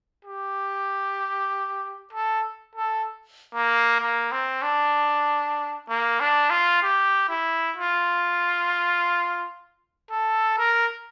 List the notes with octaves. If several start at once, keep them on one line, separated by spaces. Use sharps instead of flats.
G4
A4
A4
A#3
A#3
C4
D4
A#3
D4
F4
G4
E4
F4
A4
A#4